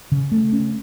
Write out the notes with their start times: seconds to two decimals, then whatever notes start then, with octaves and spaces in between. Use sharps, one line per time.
0.12 C#3
0.32 A3
0.53 C#4